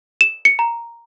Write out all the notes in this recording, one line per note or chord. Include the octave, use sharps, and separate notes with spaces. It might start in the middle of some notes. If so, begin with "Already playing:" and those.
E7
C#7
A#5